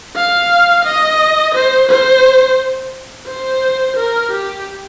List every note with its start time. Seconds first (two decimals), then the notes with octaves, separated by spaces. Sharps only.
0.16 F5
0.84 D#5
1.54 C5
1.89 C5
3.27 C5
3.96 A#4
4.31 G4